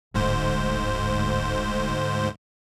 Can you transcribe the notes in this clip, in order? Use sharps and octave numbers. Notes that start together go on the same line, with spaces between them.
D1 A1 D2 G#2 C5